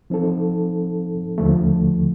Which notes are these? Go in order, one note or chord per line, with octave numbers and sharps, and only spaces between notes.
F3 C4 D#4 A4
D#2 D3 F3 A3